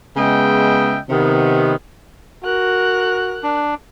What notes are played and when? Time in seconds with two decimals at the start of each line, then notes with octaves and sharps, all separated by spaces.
0.17 C#3 G#3 B3 D#5 E5 G5
1.10 C3 D#3 B3
2.44 F#4 A#4 F#6
3.43 D4